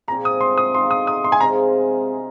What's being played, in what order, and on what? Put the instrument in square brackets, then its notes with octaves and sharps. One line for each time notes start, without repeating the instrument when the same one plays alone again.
[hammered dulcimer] A#2 F3 C4 G#4 [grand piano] A#5
[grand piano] D#6
C6
D#6
[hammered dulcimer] D#3 G#3 F4 [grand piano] C6
[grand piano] D#6
D#6
C6
G#5
[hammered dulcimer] C3 G#3 F4 G#4 [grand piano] A#5